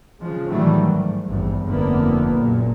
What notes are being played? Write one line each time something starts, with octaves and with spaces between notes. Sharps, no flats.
C#3 F3 G#3
A2 D#3 E3 F#3 G3 A3
G#2
G#1 E2 G2
F1 D3 A#3 B3
F#1 A#2